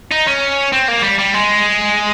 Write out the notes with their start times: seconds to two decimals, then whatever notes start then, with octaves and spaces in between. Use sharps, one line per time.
0.12 D#4
0.27 C#4
0.73 C4
0.88 A#3
1.03 G3
1.19 G3
1.34 G#3